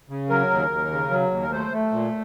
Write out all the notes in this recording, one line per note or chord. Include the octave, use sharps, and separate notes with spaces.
C#3
F#3 A#4
D#2
D#2
C#3
F#3
D#2
A#4
A3 C5
A3
A#2